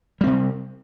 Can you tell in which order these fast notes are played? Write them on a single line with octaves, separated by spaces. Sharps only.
G3 C4 C3